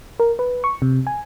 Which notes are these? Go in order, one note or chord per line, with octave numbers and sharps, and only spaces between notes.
A#4
B4
C#6
C3
G#5